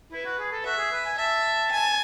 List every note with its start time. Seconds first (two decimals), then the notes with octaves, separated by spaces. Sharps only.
0.12 E4 B4
0.25 F#4
0.39 G#4
0.52 A4
0.65 F#4 E5
0.78 G#4
0.92 B4
1.05 G#5
1.18 E5 A5
1.71 G#5